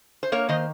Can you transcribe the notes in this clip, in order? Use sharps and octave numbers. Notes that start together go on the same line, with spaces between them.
C5
A#3 A#4 C#5
D#3 C5 D#5